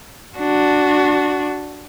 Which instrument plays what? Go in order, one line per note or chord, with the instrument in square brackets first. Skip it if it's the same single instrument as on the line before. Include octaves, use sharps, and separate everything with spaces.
[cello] D4 F#4